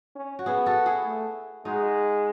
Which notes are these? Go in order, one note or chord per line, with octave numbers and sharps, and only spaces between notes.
C#4
F#4
B3 E4 G#4
F#4 A4
E4 G#4
A3
G#3 D#4 F#4